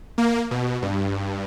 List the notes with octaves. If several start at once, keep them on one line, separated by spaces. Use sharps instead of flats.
A#3
B2
G2